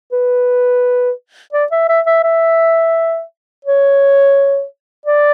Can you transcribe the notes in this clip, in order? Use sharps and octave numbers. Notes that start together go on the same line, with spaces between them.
B4
D5
E5
E5
E5
E5
C#5
D5